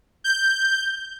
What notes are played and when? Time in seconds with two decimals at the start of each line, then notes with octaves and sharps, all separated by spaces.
0.24 G6